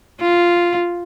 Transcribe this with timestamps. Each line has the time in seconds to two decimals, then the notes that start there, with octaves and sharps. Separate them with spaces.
0.21 F4